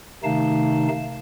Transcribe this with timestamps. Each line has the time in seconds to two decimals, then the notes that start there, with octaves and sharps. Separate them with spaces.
0.24 C3 D#3 A3 D#4 F5 A5